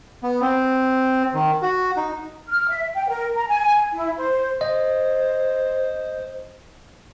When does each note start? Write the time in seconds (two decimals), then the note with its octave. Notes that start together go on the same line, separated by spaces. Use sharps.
0.23 B3
0.42 C4
1.34 D#3
1.62 F#4
1.97 D#4
2.48 F6
2.68 E5
2.95 G5
3.09 A#4
3.35 A#5
3.47 G#5
3.92 E4
4.18 C5
4.61 C5 D#5